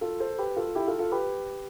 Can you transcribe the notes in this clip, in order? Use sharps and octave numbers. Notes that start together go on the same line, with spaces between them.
F4 A4
A4 C5
G4 B4
F4 A4
E4 G4
F4 A4
F4 A4
G4 B4